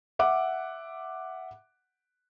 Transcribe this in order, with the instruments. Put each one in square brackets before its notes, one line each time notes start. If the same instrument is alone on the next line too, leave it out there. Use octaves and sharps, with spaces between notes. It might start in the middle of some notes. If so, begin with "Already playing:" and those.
[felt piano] E5 F#5 D6